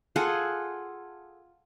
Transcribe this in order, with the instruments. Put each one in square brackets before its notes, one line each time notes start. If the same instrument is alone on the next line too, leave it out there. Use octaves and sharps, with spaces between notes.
[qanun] F4 G#4 A4 F#5